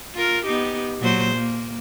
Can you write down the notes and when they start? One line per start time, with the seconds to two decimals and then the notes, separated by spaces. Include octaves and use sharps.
0.15 F4 A#4
0.45 B3 D#4 G4
0.99 A#2 F#3 C5
1.36 A#3